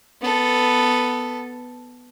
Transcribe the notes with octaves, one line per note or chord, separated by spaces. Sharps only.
B3 A4